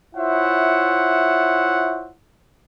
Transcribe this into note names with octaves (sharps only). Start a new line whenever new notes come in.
E4 F4 C5 C#5 E5 F#5